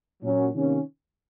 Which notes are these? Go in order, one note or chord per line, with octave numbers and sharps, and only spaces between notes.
A#2 F#3 C#4
C3 D#3 A#3 C#4